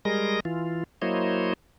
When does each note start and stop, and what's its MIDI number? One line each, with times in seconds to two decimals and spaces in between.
0.05 0.40 55
0.05 0.40 56
0.05 0.40 68
0.05 0.40 70
0.05 0.40 75
0.05 0.40 94
0.45 0.84 52
0.45 0.84 65
1.02 1.53 54
1.02 1.53 58
1.02 1.53 64
1.02 1.53 72
1.02 1.53 73
1.02 1.53 75